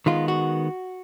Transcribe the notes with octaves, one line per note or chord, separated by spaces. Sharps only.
D#3 G#3 B3 F4
F#4